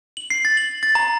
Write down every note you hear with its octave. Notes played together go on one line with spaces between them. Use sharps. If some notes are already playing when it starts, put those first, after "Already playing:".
F#7
C7
A6
F#7
A6
A#5